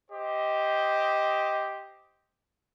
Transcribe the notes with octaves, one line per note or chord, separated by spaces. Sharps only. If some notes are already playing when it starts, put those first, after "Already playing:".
G4 C5 D#5